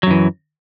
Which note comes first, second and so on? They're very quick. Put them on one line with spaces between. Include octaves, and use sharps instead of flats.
F#3 F#2 E3